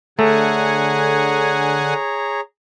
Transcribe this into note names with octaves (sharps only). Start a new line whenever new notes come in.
D3 A3 G#4 C#5 F#5 G#5 A#5